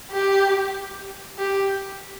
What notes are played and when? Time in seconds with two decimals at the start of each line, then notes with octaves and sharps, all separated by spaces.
0.12 G4
1.38 G4